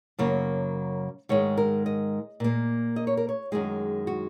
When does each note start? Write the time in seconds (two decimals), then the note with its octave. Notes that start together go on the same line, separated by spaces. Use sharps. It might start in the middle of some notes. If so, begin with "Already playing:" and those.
0.19 F#2 C#3 F#3 A#3 C#5
1.29 G#2 D#3 G#3 C#5
1.57 A#4
1.86 D#5
2.40 A#2 A#3
2.96 D#5
3.07 C#5
3.17 A#4
3.29 C#5
3.52 F#2 D#3 G#3 G#4
4.07 F#4